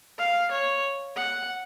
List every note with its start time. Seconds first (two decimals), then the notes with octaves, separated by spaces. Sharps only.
0.18 F5
0.51 C#5
1.16 F#5